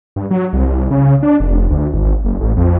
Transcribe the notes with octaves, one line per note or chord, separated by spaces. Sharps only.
G2
F#3
C2
C#3
D4
F1
D2
G#1
F#1
A1
F2